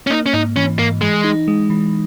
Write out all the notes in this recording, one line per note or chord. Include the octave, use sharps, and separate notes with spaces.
C#4
A#3 D#4
C#4
G#2 D#4
E3 C#4
G#2 A#3
E3 G#3
D#4
G#3
E3